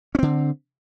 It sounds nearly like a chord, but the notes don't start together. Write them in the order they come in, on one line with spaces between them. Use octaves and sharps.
C#4 C4 D3